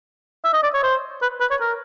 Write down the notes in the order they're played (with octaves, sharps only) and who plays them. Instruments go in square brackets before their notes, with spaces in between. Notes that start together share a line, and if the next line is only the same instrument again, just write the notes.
[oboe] E5
D#5
D5
C#5
C5
B4
B4
C#5
A#4